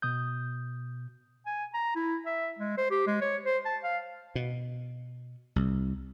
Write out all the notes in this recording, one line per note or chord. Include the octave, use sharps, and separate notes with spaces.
B2 D#6 G6
G#5
A#5
E4
E5
G#3
C5
G4
G#3
C#5
C5
A5
F5
B2
C2